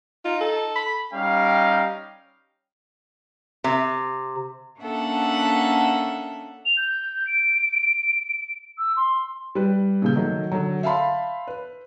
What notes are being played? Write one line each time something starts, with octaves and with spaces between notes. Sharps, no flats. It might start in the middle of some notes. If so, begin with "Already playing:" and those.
D#4 F4
A4
B5
G3 C#4 D#4 F5 G5
C3
A#3 C#4 D4 A4 E5 F#5
F7
G6
D7
E6
C6
G3 B4
A#2 C#3 G6
D#3 F#3 A3
D3 F#3
E5 F5 A5 B5 C6
B4